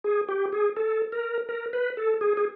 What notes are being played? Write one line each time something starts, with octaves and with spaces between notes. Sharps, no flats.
G#4
G4
G#4
A4
A#4
A#4
B4
A4
G#4
G#4